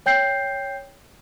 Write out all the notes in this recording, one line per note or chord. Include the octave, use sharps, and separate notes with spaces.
C#5 G5 G6 C7